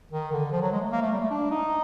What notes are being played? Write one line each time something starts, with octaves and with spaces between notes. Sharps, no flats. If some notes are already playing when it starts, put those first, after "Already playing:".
D#3
D3
F3
F#3
G#3
A3
A#3
A3
G3
A3
D4
D#4